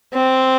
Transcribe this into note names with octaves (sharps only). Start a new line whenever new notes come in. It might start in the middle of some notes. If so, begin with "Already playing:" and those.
C4